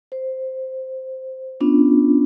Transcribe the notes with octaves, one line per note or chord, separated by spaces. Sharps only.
C5
B3 C#4 D4 F4